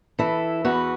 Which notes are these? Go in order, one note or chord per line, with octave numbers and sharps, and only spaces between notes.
E3 E4 A4
E2 F#4 B4